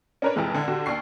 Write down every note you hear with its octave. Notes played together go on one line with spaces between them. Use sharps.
C#4 D4 A#4 B4 C#5
F1 F2 E3 G#3
D3
D3 F#4 G4
D#2 D4 C#6 C7